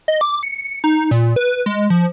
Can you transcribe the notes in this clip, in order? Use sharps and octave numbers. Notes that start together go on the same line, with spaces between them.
D#5
D6
C#7
D#4
A#2
B4
G#3
F3